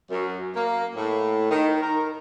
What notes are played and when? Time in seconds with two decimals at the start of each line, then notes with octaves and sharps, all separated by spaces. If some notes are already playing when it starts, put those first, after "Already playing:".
0.10 F#2
0.56 A#3
0.95 A2
1.50 D#3
1.82 A#4